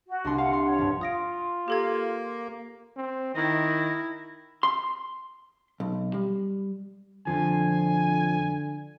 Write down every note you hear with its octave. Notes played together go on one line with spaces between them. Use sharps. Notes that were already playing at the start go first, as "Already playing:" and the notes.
F#4
C2 D4 C6
F5 F#5
C6
C#5 F#5
G2 F3
F4 D#6 A#6 D7
A#3 G4 A4 G#6
C4
D#3 E4 A#6
C6
B1
G3
F2 D3 F3 G#5